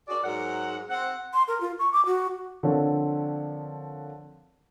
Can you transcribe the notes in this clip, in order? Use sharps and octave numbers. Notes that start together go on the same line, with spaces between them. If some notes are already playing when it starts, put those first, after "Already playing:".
F#4 G#4 A#4 D5
G#2 F#3 A#4 F#5
C4 F#5
C6
A#4
F4
C#6
D6
F#4
D3 F3 C4 D4 A#4 C#5